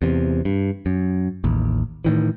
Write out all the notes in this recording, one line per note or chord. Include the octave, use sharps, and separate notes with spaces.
E2 C3
G2
F#2
A1 D#2
A2 D#3 E3